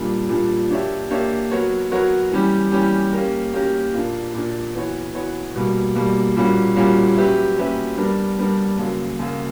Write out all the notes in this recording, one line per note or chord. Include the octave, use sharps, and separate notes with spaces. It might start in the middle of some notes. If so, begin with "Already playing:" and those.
Already playing: A#2 G3 A#3 D4
A#2 G3 A#3 D4
A#3 D4 G4 C#5 E5
A#3 D4 G4 C#5 E5
F#3 B3 F#4 A#4 C#5
F#3 B3 F#4 A#4 C#5
E3 G3 C#4 G4
E3 G3 C#4 G4
A#3 C#4 G4 A#4
A#3 C#4 G4 A#4
A#2 A#3 D4
A#2 A#3 D4
E3 B3 F#4 C#5
E3 B3 F#4 C#5
B2 G3 A#3
B2 G3 A#3
A#2 G3 A#3 C#4 F#4
A#2 G3 A#3 C#4 F#4
F#3 C#4 G4 B4 E5
F#3 C#4 G4 B4 E5
G3 B3 D4 A#4
G3 B3 D4 A#4
F#2 C#3 F#3 A#3
F#2 C#3 F#3 A#3